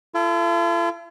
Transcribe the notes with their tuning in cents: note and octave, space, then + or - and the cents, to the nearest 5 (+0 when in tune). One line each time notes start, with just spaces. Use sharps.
F4 -45 A4 +0